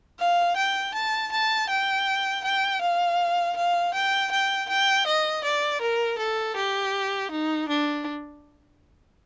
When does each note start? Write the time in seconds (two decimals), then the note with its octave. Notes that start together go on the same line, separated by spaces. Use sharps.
0.19 F5
0.57 G5
0.94 A5
1.32 A5
1.69 G5
2.44 G5
2.81 F5
3.56 F5
3.94 G5
4.31 G5
4.69 G5
5.07 D#5
5.44 D5
5.82 A#4
6.18 A4
6.56 G4
7.31 D#4
7.68 D4